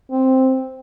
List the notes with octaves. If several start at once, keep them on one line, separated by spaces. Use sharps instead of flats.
C4